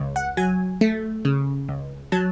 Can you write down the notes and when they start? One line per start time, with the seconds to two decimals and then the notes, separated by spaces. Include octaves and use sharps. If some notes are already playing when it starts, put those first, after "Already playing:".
Already playing: C#2
0.16 F#5
0.37 F#3 G#5
0.81 A3
1.25 C#3
1.69 C#2
2.12 F#3 A5